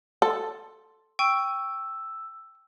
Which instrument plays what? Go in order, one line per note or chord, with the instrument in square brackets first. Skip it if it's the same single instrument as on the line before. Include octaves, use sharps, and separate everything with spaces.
[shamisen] A4 [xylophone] C6
[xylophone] G5 C#6 D#7 [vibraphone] E6